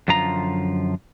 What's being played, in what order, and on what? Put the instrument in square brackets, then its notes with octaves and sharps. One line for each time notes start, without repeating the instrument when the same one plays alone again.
[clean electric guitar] F#2 D3 F3 F4 A#5